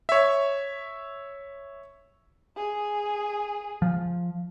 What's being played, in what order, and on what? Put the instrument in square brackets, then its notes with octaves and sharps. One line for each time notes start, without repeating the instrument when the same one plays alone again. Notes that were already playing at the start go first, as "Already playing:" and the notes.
[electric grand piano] C#5 E5
[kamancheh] G#4
[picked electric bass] F3